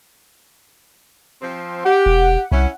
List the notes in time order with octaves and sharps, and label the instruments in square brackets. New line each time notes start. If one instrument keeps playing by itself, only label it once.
[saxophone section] F3 C4
[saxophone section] G4 [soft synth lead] F#5
[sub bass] E1
[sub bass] C2 [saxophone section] C#4 E4